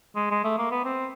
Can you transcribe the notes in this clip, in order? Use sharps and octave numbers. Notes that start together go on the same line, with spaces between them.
G#3
G#3
A3
A#3
B3
C4